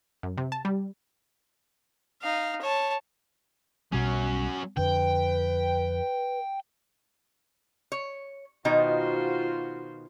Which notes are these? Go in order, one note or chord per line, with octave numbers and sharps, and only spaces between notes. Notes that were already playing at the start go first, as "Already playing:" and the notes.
F#2
C3
A5
G3
D#4 F5
C#5 A5
B1 B2 F#3 G3 C#4
F2 D3 B4 G5
C#5
B2 D#3 D#4 F4 F#4 C5